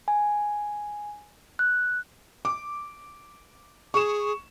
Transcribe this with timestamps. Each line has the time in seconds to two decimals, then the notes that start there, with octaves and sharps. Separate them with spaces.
0.08 G#5
1.59 F#6
2.45 D6
3.94 G#4 C#6 E7